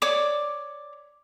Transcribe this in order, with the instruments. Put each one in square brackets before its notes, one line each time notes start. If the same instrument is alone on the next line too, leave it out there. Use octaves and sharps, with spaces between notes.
[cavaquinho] C#5 D5 D6